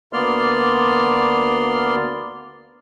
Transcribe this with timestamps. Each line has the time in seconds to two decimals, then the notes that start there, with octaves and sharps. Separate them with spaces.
0.13 D2 A#3 B3 D5 C6 F6